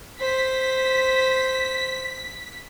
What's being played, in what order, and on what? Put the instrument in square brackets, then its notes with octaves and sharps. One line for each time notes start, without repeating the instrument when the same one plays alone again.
[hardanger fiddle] C5 [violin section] B6